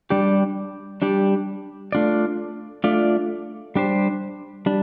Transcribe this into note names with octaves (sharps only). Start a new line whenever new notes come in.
G3 D4 G4 D5
G3 D4 G4 D5
A3 D4 F4 D5
A3 D4 F4 D5
G3 D4 G4 C5
G3 D4